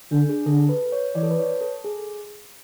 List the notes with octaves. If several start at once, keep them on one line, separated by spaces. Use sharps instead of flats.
D3 D4
G#4
D3 A4
B4
C#5
E3 D5
A4
B4
C#5
A4
G#4